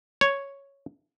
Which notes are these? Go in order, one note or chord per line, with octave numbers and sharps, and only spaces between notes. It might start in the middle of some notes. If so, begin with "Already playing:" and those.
C#5